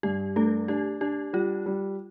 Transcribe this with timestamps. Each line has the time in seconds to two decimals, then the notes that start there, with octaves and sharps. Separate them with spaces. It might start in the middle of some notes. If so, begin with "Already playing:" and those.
0.03 G2 G4
0.36 A3 D4 A4
0.68 D4 G4
1.01 D4 G4
1.33 G3 F4
1.66 G3